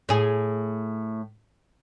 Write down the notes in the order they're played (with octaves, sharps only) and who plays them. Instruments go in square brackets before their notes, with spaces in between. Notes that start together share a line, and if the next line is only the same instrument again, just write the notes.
[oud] A2 G#4